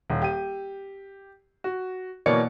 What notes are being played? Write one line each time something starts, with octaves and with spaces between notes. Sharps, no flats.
D#1
G4 D#7
F#4
B2 E3 A#3 C#5 D5 C#7